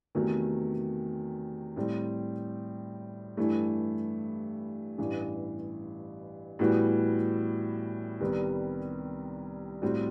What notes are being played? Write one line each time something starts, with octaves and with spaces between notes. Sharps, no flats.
E2 C3 D#3 F#3 A3
A2 G3 C4
G2 E3 A3 E4
A1 G2 E3
A2 E3 G3 B3 F#4
C2 C3 D#3 G3 B3
A2 G3 C4 F#4